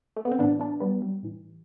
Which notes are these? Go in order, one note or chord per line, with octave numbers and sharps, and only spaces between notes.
A3
B3
C4
A2 E3 B3 D4
B3 D4
G3 B3
G3
A2 E3